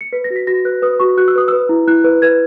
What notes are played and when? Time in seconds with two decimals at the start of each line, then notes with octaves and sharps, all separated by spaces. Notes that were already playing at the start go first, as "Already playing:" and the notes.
0.01 C#7
0.13 B4 B6
0.24 A#6
0.30 F#4
0.36 B6
0.47 F#4 A#6
0.65 B4 F#6
0.82 B4 D#6
1.00 F#4 C#6
1.17 F#4 F#6
1.28 E6
1.36 B4 D#6
1.48 B4 E6
1.69 E4
1.88 E4 F#6
2.04 B4
2.22 B4 G#6